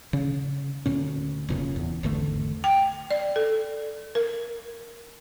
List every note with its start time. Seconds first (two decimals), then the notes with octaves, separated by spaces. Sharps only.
0.13 C#3 C#4
0.86 D2 A#2 C#4
1.49 E1 A#2 C#3
1.76 E2
2.03 G#1 E2 D3 A3
2.64 G5
3.11 D5
3.36 A4
4.15 A#4